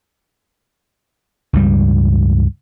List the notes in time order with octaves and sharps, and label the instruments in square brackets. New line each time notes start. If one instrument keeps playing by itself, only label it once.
[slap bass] C#2 G2 G3